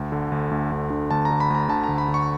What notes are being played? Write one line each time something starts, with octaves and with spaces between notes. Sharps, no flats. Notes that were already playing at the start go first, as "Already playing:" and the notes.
Already playing: D2
D3
D2
D2
D2
D3
D2 A5
A#5
D3
B5
D2 A#5
D3 A5
A#5
D2
B5
D3
C#6